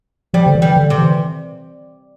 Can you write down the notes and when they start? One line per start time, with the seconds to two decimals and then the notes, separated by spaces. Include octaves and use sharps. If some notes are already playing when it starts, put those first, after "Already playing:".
0.34 F3 G3
0.47 D3
0.55 E3
0.62 G3
0.77 D3
0.90 C3
0.98 E3